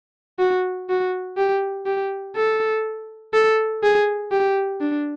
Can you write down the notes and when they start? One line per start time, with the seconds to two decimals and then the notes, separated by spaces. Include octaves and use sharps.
0.39 F#4
0.89 F#4
1.37 G4
1.86 G4
2.36 A4
3.33 A4
3.83 G#4
4.31 G4
4.81 D4